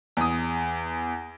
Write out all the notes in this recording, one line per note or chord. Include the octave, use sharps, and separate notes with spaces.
E2 D#6